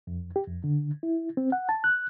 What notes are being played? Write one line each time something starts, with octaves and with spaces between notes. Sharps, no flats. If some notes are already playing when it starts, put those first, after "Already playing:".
F2
G4
F2
D3
E4
C4
F#5
A5
F#6